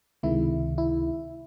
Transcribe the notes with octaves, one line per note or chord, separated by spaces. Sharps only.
C#2 C3 D#3 G#3 E4
E4